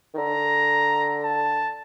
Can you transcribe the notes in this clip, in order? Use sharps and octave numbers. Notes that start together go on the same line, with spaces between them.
D#3
D3 A#5
A5